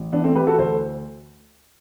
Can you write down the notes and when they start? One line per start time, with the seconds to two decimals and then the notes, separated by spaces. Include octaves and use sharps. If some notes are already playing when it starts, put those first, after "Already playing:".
Already playing: A1
0.12 E3 B3 D4
0.24 A3 C4
0.35 E3 G4 B4
0.47 F#4 A4
0.58 D2 A4 C5